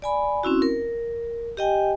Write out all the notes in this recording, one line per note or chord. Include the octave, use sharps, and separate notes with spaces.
D5 G#5 B5
C4 C#4 E4 F#4
A#4
G4 D#5 G5 G#5